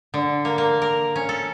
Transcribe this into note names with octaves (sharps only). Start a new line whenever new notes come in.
D3
A#3
A#3
A#4
C#4
A4